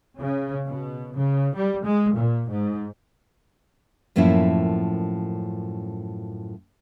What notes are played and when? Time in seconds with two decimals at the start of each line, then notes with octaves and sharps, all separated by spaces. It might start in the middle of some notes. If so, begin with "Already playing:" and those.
0.20 C#3
0.65 B2
1.15 C#3
1.55 G3
1.84 G#3
2.14 A#2
2.49 G#2
4.16 F#2 A2 F3 A#3 C#4 E4